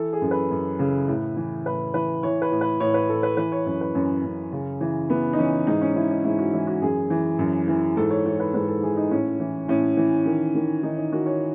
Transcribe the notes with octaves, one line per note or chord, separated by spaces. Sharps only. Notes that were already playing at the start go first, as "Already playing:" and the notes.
Already playing: E3 A4
G#4
F#2
B4
F#2
C#3
A2
E3
A2 B4
E3 B4
E3 C#5
B4
A2
B4
A2 C#5
B4
A2 A4
B4
E3 B4
C#5
F#2 C#5
B4
F#2 C#4
F#2
C#3
E3
E3 B3
D#4
E3 C#4
G#2 D#4
C#4
E3 E4
D#4
G#2 E4
F#4
E3 E4
F#4
F#2 G#4
E3
F#2
E3
G#2 A4
C#5
E3 C#5
B4
G#2 B4
A4
E3 G#4
D#4
A2 C#4
E3
A2 C#4
E3
D#3
D#3
D#3 D#4
D#4
D#3 F#4
C#5